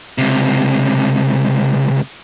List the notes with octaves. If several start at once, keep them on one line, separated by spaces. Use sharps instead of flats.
C#2 C3